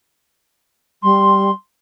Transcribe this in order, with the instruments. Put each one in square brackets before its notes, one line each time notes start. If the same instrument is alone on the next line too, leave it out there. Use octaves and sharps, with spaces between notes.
[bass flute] G3 [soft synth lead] C6